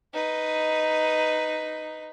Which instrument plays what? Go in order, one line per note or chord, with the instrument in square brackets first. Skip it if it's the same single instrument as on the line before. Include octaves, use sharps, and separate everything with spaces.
[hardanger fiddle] D#4 B4